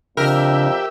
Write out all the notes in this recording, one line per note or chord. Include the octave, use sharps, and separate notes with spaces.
F2 C#3 D4 G4 A#4 E5